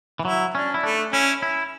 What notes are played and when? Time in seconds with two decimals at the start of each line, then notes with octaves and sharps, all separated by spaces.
0.19 E3
0.25 F#3 E4
0.54 C#4 D4
0.74 E4
0.83 A3 D4
1.13 C#4 E4
1.42 E4